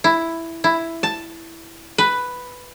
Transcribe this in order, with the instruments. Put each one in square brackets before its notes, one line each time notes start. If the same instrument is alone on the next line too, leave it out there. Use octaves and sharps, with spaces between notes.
[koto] E4
E4
A5
B4